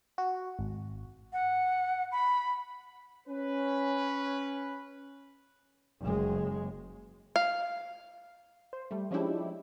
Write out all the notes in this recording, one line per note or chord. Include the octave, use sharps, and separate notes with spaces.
F#4
G#1
F#5
B5
C#4 B4
F#1 G#3
F5
C5
G3 A3
F3 G#3 C#4 D4 E4 G4